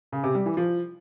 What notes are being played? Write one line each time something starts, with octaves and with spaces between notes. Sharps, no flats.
C#3
C3
G3
E3
F3